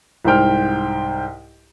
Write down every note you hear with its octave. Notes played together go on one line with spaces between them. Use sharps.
C2 G#2 C5 G5 F6